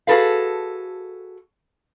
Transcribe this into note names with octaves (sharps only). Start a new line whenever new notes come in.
F#4 G#4 A4 B4 F5